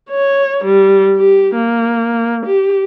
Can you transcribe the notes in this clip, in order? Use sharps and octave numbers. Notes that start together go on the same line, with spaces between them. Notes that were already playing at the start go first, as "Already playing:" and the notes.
C#5
G3
G4
A#3
G4